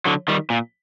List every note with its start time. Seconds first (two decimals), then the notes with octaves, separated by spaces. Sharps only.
0.05 D3 F#3
0.28 D#3 G3
0.50 A#2